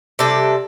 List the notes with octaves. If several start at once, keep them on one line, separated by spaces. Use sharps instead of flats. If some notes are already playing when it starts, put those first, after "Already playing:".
C3 G3 D4 A4